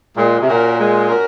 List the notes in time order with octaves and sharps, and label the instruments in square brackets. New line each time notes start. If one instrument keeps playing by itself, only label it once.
[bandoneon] A#2 [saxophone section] G#3
[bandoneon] C3
[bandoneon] A#2 [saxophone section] C#4 F#4 A#4
[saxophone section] G#3
C#4 F#4 A#4